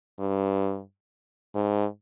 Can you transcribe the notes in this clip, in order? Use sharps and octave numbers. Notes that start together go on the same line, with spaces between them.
G2
G#2